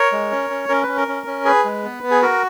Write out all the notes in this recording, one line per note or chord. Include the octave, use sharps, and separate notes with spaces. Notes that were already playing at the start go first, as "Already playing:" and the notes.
Already playing: A#4 C#5
G#3
C#4
C#4
C#4 A#4
C#4 B4
A#4
C#4
C#4
G#4 B4
G#3
B3
B3
G#4
F#4 A#4